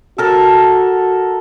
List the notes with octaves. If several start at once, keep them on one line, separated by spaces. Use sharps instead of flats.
F#4 A4 A#4 A5